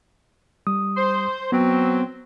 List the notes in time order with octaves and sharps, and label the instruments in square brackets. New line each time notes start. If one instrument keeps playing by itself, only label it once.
[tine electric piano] G3 D#6
[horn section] C5
[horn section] F#3 C4 [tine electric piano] B3